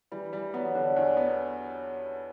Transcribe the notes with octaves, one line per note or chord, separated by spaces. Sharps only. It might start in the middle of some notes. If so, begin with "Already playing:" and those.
E3 G3
E3 G3
F#3 B3
D3 D4
E2
B3